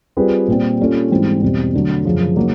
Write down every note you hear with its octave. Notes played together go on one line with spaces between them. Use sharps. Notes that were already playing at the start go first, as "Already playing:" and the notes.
G3 C4 F4 G#4 B4
A#2 G3 C4
G3 A#3 C#4 F4 A4
G#2 E3 G3 C4
E2 B2 G3 C4
D3 F#3 A3 D4
F#2 C#3 F3
C#3 F#3 A#3 D#4